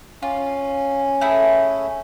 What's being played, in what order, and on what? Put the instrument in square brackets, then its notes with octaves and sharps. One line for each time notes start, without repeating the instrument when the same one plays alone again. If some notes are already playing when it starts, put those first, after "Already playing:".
[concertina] C#4 [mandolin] F4
[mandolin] A3 E4 G#4